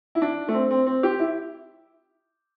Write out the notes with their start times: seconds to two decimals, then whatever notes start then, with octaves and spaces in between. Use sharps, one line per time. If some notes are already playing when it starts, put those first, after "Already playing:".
0.15 E4
0.22 D4
0.48 A3
0.54 C4
0.71 C4
0.86 C4
1.03 G4
1.20 E4